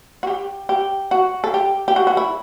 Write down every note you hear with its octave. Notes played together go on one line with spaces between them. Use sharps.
F#4
G4
G4
F#4
A4
G4
G4
F#4
F#4
E4